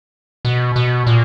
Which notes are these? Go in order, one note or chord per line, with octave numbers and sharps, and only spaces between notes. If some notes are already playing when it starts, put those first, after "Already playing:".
B2
B2
A#2